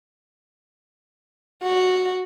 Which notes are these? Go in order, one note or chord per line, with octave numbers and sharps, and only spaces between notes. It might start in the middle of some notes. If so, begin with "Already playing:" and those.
F#4